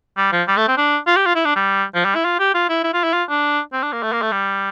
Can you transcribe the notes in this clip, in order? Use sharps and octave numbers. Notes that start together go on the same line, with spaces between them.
G3
F3
G3
A3
C4
D4
F4
G4
F4
E4
D4
G3
F3
G3
E4
F4
G4
F4
E4
E4
F4
E4
F4
D4
C4
D4
A#3
A3
A#3
A3
G3